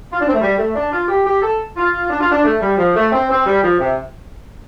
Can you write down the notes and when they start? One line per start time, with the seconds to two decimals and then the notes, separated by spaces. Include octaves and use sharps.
0.12 F4
0.20 D4
0.27 C4
0.34 A3
0.41 G3
0.58 A3
0.75 D4
0.92 F4
1.08 G4
1.26 G4
1.42 A4
1.77 F4
2.10 D4
2.20 F4
2.32 D4
2.44 A3
2.61 G3
2.78 F3
2.95 A3
3.12 C4
3.29 C4
3.46 G3
3.63 F3
3.79 C3